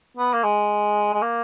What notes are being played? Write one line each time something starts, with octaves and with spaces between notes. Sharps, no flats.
B3
A#3
G#3
G#3
A#3